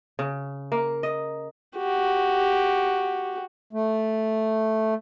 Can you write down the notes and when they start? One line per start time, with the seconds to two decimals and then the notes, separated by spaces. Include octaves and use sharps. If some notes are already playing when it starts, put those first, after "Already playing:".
0.19 C#3
0.72 A#3
1.03 D#5
1.77 F#4 G4
3.73 A3